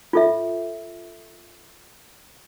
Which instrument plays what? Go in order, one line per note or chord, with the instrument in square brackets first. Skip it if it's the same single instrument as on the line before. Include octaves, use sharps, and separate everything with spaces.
[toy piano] F4 A4 E5